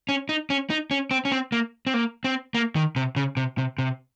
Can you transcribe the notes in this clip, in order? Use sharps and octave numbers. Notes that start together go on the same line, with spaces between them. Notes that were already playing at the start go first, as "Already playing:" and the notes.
C#4
D#4
C#4
D#4
C#4
C4
C#4
C4
A#3
C4
A#3
C4
A#3
D#3
C3
C#3
C3
C3
C3